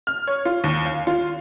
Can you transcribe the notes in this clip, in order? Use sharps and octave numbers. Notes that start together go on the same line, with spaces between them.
F6
C#5
F4
D#2
F5
F4